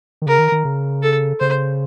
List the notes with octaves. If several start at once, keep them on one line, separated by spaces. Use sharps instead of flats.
D#3
C#3 A#4
D#3
D#3
C#3
A4
C#3 C5